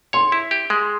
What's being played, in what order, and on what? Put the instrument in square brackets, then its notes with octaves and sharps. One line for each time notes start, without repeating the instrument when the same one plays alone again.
[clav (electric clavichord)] C#5 [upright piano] C6
[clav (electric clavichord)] E4
G4
G#3